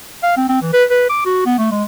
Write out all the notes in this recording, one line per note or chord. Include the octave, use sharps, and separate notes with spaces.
F5
C4
C4
E3
B4
B4
D6
F#4
B3
A3
G#3